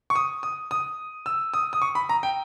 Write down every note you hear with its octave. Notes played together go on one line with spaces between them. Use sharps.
C#6
D#6
D#6
D#6
E6
D#6
D#6
C#6
B5
A#5
G5